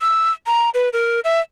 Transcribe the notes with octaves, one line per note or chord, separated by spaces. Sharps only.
E6
A#5
B4
A#4
E5